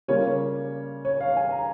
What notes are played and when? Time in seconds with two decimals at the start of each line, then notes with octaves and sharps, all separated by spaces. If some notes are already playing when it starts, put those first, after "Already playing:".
0.08 C#3 G3 A#3 C#4 F4 C#5
1.05 C#5
1.21 F5
1.36 G#5
1.52 A#5